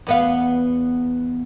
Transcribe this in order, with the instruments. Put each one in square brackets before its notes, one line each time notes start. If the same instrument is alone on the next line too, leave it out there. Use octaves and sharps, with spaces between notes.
[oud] E2 B3 F5